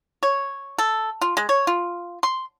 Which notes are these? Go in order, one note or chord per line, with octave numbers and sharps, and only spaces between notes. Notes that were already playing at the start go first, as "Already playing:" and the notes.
C#5
A4
F4
G#3
C#5
F4
C6